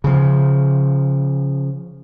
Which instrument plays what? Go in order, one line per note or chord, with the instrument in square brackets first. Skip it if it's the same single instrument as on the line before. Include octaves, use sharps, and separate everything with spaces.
[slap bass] C#3 F3